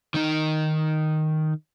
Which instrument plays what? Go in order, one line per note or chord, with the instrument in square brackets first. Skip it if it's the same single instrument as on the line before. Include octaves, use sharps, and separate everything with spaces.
[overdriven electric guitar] D#3 D#4